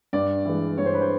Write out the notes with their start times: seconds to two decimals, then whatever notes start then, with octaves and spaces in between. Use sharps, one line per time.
0.13 G2 D5
0.45 E3 G#3
0.78 G2 C#5
0.86 C5
0.94 B4
1.01 C5